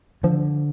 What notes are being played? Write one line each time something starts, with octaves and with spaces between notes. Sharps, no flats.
D3 F3